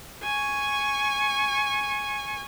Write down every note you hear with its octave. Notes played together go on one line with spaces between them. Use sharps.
G#5 C#6